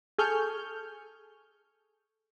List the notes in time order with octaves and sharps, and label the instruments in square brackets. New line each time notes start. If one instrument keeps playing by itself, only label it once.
[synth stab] G#4 A4 G#5 C#6 F6 G6